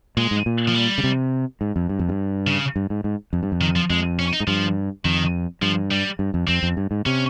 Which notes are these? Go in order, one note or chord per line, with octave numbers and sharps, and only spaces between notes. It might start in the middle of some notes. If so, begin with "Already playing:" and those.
A#2 G#3
G#2
A#2
F3
G3
C#3
C3
G#2
F2
G2
F2
G2
C#3
G2
G#2
G#2
F2
G2
F2
D#3
F3
F2 G#3
C#4
D#4
G#2
G2 F3
F2 D#3
G2 F3
G3
G2
F2
F2 C4
F2
G2
G#2
C3 C#4